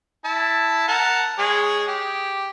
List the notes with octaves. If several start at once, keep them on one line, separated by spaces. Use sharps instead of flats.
E4 A5
A#4 F#5 A5
G#3 G#4 C#5
G4